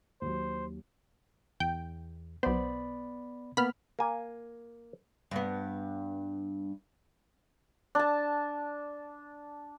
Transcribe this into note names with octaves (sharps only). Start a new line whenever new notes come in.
D#2 F#3 C5
E2 G5
B1 B3 C5 D5 B5
A#3 B3 B5 F6
A#3 G#5
G2 B3
D4 A5